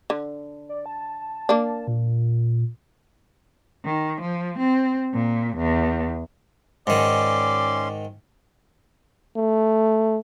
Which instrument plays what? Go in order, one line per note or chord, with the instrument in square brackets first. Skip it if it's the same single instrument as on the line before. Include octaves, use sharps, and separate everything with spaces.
[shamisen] D3
[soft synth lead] D5
A5
[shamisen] A#3 D4
[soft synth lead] A#2
[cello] D#3
F3
C4
A#2
E2
[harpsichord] G#2 D#3 [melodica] C#4 C6 [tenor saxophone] D5
[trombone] A3